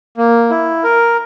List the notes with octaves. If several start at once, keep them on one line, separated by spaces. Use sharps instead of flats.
A#3
E4
A#4